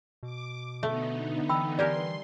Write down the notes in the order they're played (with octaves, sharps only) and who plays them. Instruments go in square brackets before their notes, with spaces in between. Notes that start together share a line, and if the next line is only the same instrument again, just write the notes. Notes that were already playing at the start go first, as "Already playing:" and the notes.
[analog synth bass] B2 [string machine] D6
[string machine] D3 B3 D#4 [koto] A3
[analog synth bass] E3 [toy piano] G5 B5 E6
[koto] G3 G4 A#4 [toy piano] D5 G#5 [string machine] C6